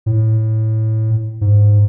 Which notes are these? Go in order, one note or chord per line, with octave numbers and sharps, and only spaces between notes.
A2
G#2